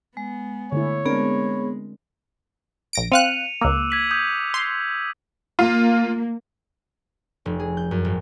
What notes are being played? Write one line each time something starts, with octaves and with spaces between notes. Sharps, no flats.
G#3 B3
D3 A3 E4 C#5
G#3 B3 C4 D4 G#4 A#4
A#1 A#6 D7
C4 F5 F#6 C#7 D#7 F7
C#2 A#3 D6 E6 F#6
G#6 B6 F#7
D#6 G6 G#6
C6
A#3 F4
F1
G#4
G6
F#2
G#1